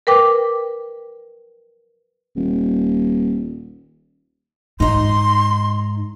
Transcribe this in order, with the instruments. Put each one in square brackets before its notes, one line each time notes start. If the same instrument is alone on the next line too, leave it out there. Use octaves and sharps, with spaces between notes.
[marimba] A#4 B4 G5 D6
[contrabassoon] D#1
[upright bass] G#2 [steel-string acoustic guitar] D#4 D#5 [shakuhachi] C6